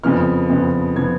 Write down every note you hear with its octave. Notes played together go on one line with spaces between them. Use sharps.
F2 C#3 F3 B3 F6
F2 C#3 F3 B3
C#3 F3 B3 G#6